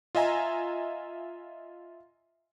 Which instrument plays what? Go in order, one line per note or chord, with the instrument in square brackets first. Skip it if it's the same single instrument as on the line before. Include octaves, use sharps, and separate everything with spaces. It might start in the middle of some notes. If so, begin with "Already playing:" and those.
[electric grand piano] F4 D#5 E5 G#5 A#5